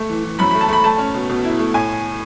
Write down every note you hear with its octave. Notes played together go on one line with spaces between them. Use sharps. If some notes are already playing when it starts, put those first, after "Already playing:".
Already playing: A3
E3
E3
F#2 B5
A3 B5
A5
A3 B5
A3 A5
C#4
B2
B2
E4
A3
A2 G#5